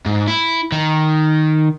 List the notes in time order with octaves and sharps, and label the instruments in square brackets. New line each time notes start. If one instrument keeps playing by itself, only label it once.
[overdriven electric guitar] G#2
E4
D#3